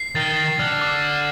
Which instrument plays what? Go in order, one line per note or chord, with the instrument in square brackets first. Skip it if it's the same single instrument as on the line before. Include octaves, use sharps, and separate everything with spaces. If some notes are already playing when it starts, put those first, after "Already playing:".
Already playing: [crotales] C7
[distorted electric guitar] D#3 [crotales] A6
[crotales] A6
[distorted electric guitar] D3 [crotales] F6
[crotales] D6